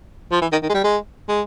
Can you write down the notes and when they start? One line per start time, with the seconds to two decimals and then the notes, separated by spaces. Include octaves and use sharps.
0.31 F3
0.41 E3
0.52 D#3
0.62 D#3
0.69 G#3
0.74 G3
0.84 G#3
1.28 G#3